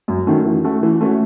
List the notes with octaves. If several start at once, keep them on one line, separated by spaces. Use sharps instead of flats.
F#2
D#3 F#3 A3 C#4
E3
A3 C#4 F#4
E3
A3 C#4 F#4